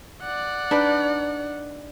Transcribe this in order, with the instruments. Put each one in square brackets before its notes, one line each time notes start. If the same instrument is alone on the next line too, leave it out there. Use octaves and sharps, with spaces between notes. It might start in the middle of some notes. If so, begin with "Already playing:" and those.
[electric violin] D5 F#5
[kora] D4 D#4 B4